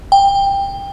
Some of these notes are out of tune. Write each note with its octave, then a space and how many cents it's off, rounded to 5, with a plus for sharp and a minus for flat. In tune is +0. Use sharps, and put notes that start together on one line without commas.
G5 +20